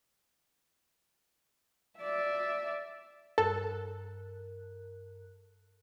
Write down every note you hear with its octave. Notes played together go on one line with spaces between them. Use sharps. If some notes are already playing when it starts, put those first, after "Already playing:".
D5 E5
G2 A4 A#4 F#6